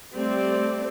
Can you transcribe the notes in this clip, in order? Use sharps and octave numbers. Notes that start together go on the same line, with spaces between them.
G3 A3 C4 D5